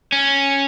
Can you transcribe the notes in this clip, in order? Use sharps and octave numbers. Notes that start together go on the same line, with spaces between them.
C#4